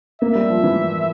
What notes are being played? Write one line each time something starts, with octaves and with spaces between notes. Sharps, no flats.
A#3 E5
G3
F3
E3